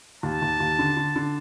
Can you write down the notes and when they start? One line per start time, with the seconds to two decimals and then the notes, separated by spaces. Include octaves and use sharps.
0.23 D#2 A5
0.42 D#2
0.60 D#2
0.79 D3
0.97 D3
1.16 D3